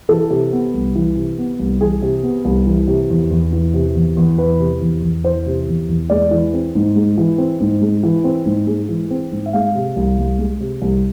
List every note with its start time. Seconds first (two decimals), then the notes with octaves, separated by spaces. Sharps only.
0.09 E3 A4
0.30 C3
0.52 B3
0.74 C2
0.95 E3
1.16 C3
1.38 B3
1.59 C2
1.81 E3 G#4
2.02 C3
2.23 B3
2.45 C2
2.66 E3
2.87 C3
3.10 E2
3.31 E2
3.53 E3
3.74 C3
3.96 E2
4.17 E2
4.38 E3 B4
4.59 C3
4.81 E2
5.03 E2
5.24 E3 C5
5.46 C3
5.68 E2
5.89 E2
6.10 G#3 D5
6.31 E3
6.54 C4
6.75 G#2
6.96 G#3
7.18 E3
7.38 C4
7.61 G#2
7.81 G#3
8.03 E3
8.24 C4
8.46 G#2
8.67 G#3
8.89 E3
9.11 C4
9.31 G#2
9.46 E5
9.53 G#3 F5
9.75 C3
9.96 C2
10.18 C2
10.39 G#3
10.60 C3
10.82 C2